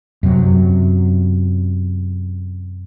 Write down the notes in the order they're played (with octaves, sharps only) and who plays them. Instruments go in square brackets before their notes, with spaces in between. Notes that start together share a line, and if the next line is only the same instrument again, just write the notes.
[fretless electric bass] F#2 C3 F#3